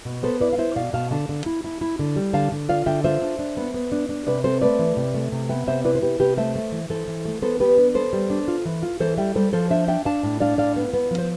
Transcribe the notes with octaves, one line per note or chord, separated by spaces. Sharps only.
B2
B3 A4 C5
E4 B4 D5
F5
E4 C5 E5
B2 D5 F5
B2 F5 A5
D3 F5 A5
D3
E4
E4
E4
D3
G3
D3 F5 A5
D3
F4 D5 F5
D3 E5 G5
F4 C5 E5
D4
D4
B3
B3
D4
D4
C3 B4 D5
C4 A4 C5
A3 B4 D5
E3
C3
A3
C3
B3 E5 G5
C3 C5 E5
E4 B4 D5
C5
C3 G4 B4
C3 G4 B4
A3 C5 E5
A3
E3
E3 A4 C5
E3
A3
B3 A4 C5
B3 G4 B4
D4
B3 A4 C5
G3
D4
F4
E3
F4
E3 A4 C5
G3 E5 G5
G3 A4 C5
F3 A4 C5
D4 C5 E5
D4 E5 G5
D4 F5 A5
A2
D4 D5 F5
A2 D5 F5
B3
B3
F3
C5